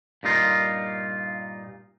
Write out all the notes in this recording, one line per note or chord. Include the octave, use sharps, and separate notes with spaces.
G2 A#2 D#4 F4